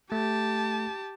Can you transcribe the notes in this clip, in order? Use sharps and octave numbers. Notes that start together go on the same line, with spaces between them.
A3 G4 A5